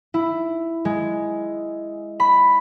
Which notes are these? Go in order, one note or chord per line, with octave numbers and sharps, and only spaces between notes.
E4
G#3
B5